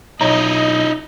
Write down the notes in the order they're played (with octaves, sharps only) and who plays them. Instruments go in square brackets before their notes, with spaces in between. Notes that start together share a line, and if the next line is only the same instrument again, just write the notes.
[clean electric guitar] B1 C#5 A#5 [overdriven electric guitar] D#4 E4 [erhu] D#5